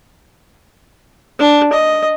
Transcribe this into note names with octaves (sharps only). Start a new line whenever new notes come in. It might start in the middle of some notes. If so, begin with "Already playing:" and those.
D4
D#5